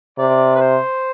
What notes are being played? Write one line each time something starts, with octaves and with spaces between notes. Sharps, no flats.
C3 D5
B4
C5